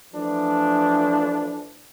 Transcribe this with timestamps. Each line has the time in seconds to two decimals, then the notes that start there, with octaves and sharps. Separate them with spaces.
0.14 E3 F3 A3 D4